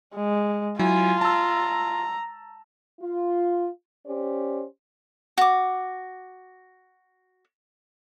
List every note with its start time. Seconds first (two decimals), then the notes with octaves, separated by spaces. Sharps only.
0.14 G#3
0.79 F#3 E4 F4 G#5
1.21 A5 A#5 E6
3.01 F4
4.06 C#4 G4 C5 D5
5.38 F#4 D6